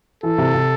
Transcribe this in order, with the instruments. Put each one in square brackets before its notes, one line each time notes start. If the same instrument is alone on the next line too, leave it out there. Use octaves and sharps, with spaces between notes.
[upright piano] E3 [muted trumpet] A4
[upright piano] C3
C3